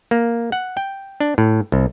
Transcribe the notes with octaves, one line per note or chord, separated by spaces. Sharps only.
A#3
F#5
G5
D4
A2
C2